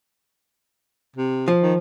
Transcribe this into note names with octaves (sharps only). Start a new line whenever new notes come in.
C3
F3
D#3